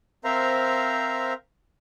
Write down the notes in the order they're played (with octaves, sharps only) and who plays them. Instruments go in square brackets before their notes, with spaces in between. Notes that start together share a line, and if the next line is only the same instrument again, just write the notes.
[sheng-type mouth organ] C4 A#4 C5 E5 F5 A#5